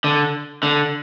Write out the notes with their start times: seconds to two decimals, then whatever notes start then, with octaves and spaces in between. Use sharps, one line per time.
0.04 D3
0.63 D3